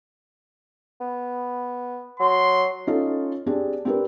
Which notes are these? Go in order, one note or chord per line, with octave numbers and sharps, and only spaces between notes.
B3
F#3 C6
C#4 D#4 F4 A4
C4 D4 G4 G#4
C4 D4 G4 A#4 B4